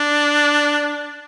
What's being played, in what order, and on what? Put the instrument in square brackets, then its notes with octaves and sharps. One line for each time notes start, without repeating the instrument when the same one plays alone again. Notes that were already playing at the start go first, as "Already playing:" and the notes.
Already playing: [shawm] D4